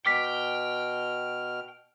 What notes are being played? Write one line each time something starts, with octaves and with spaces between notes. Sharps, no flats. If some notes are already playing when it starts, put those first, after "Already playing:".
B2 G5 D6 F6 B6